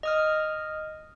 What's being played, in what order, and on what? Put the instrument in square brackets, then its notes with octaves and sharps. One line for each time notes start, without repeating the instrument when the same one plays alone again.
[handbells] D#5 D#6 F6